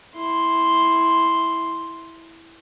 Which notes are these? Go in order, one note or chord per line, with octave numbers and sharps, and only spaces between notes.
E4 C6